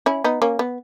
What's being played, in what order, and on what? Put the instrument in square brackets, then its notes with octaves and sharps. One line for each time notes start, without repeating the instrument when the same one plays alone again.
[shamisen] C#4 E4
B3 D#4
A#3 C#4
B3